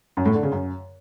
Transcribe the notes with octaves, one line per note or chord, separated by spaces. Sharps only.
F#2
A2
D3
C#3
F#2